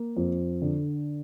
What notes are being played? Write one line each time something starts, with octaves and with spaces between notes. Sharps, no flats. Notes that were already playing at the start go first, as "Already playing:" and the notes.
Already playing: A#3
F2
D3